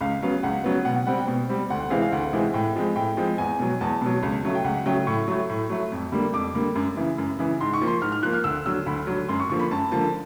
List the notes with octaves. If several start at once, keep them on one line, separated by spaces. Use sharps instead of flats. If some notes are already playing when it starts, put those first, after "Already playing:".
C#2 F5
C#3 F#3 B3 F5
C#2 F#5
C#3 F#3 B3
B2 F#5
F#5
G3 C4 F#5
G5
B2
G3 C4
D2 F#5
F#5
C3 E3 G#3 C4 F5
F5
D2 F#5
C3 E3 G#3 C4
A2 G5
F3 G#3 C4
A2 G5
F3 G#3 C4
E2 G#5
B2 F#3
E2 A5
B2 F#3
C#2
C#3 F#3 A3
G5
C#2 F#5
C#3 F#3 A3 G5
A2 C#6
F#3 A3
A2
F#3 A3
F2
D3 G3 A#3
F2 D6
D3 G3 A#3
F#2
C#3 E3
F#2
C#3 E3
G#2 C6
C#6
F3 A#3
C6
G#2 F6
F6
F3 A#3 F#6
F6
D2 E6
D3 F#3 E6
D2 B5
D3 F#3
F#2 C6
C#6
D3 F3 A#3 C#6
B5
F#2 A5
D3 F3 A#3 A5